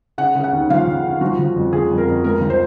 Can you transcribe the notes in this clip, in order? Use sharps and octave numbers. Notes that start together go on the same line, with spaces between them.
C#3 F#5
C#3
F#5
D#2
F3 F5
F3
C#3
F3 F#4
F3
F2
F3 G#4
F2
A#4
F2
C#2 A#4
F3
C5